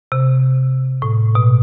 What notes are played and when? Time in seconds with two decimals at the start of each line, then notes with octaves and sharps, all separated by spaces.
0.12 C3
1.02 A2
1.35 B2